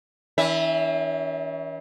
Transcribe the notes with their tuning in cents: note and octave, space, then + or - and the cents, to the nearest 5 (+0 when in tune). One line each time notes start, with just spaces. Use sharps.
E3 -40 C#4 +35 E5 +0